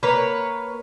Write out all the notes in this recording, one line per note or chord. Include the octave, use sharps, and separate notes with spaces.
A#3 B4 C#5